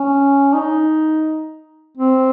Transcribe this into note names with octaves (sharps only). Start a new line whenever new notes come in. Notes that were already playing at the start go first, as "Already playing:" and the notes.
Already playing: C#4
D#4
C4